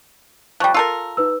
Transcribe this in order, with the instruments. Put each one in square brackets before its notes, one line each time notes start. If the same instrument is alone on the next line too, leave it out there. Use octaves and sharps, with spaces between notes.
[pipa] F3 G3 [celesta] G5 C#6 F#6
[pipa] F4 A4 A#4 [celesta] E6
[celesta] D#4 B4 E6